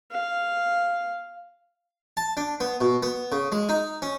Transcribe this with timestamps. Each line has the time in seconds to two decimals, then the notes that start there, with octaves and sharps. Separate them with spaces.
0.12 F5
2.17 A5
2.37 D4
2.60 B3
2.81 B2
3.03 B3
3.32 C#3
3.52 G#3
3.69 D#4
4.02 C#4